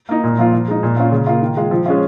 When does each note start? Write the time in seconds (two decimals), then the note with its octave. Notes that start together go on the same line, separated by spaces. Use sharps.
0.09 A#3 D#4
0.24 A#2
0.38 F3 A#3 F4
0.53 F3
0.68 G#3 D#4
0.83 A#2
0.97 A#3 C#4 F4
1.12 C#3
1.27 A#3 F4
1.41 D#3
1.57 G#3 F4
1.71 F3
1.86 G#3 C#4 F4